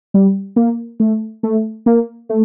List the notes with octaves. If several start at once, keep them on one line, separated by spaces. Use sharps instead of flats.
G3
A#3
A3
A3
A#3
A3